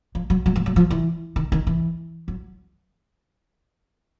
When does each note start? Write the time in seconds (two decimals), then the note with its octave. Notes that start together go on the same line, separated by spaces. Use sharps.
0.15 F3
0.30 F#3
0.46 F#3
0.56 F3
0.66 F#3
0.76 F3
0.91 E3
1.36 D#3
1.52 D#3
1.67 E3
2.28 F#3